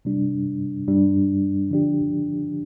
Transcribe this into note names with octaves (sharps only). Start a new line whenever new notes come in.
C3 G3 D4
G2 G3 D4
D3 F3 D4 G4